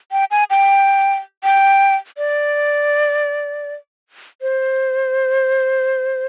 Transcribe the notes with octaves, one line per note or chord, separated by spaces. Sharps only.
G5
G#5
G5
G5
D5
C5